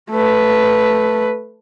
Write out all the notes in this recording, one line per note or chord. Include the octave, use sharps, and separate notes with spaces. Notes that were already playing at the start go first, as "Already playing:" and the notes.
A3 B4